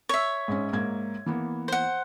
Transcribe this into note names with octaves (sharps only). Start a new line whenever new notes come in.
C#5 E5
G#2 G#3 C#4
G#2 A#3 G#6
E3 A#3 B3
C5 F#5